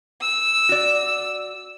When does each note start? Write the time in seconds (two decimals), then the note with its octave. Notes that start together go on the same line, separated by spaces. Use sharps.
0.22 E6
0.69 F#4 D5